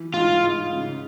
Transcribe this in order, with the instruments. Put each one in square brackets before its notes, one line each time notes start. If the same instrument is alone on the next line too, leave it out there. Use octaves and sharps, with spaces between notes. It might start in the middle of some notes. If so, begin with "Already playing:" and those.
Already playing: [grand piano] E3
[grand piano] G#2 [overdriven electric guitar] F4
[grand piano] G#2
C#3